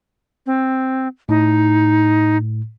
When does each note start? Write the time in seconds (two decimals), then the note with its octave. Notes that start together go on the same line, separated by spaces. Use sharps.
0.46 C4
1.29 A2 D#4